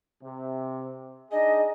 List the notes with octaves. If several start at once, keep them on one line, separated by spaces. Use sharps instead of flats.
C3
D4 D#4 G#4 D#5